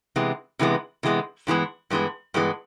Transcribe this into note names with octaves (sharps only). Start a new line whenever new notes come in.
C3 E3 G#3 B3
C3 E3 G#3 B3
C3 E3 G#3 B3
G2 E3 G#3 B3
G2 E3 G#3 B3
G2 E3 G#3 B3